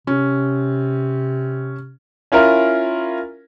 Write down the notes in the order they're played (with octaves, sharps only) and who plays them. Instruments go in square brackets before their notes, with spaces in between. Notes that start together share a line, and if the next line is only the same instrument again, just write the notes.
[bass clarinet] C3 [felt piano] C#4
[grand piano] C#4 E4 F4 A#4